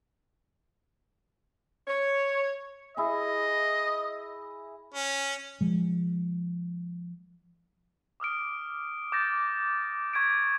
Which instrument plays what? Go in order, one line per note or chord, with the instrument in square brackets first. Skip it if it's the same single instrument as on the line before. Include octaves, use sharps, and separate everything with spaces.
[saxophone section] C#5
[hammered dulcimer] E4 G#4 [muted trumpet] D#5
[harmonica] C#4
[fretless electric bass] F3 G#3
[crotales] D6 D#6 F6 D7
D6 G6 A6 A#6
C#6 G#6 B6 D7